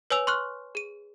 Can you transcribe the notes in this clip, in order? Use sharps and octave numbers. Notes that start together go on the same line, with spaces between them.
B4 C#5 G#5 E6 F7
C6 C#6 F6 F#6
G#4 D#7